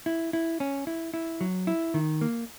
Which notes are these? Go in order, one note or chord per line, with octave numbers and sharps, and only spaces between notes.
E4
E4
C#4
E4
E4
F#3
E4
D#3
A#3